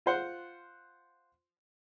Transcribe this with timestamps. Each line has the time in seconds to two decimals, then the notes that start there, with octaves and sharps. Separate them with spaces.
0.06 F4 C5 F#5